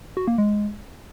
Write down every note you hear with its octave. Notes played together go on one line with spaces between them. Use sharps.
F#4
A#3
G#3